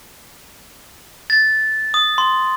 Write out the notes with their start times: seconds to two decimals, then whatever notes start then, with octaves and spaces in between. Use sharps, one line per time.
1.30 A6
1.94 D#6
2.18 C6